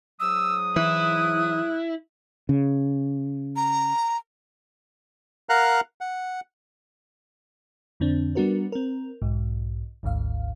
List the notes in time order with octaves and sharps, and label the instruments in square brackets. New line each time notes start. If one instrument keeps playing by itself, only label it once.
[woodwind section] G#2 F#3 D#6 [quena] E6
[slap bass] E3 [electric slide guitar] E4 [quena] F#6
[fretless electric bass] C#3
[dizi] A#5
[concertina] A#4 F5 F#5 A#5 F#6
F#5
[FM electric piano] F2 D3 C4 D4
G3 B3 D4 F#4 A#4 B4
C4 A#4
B1 G#2
G#1 D2 G#2 F5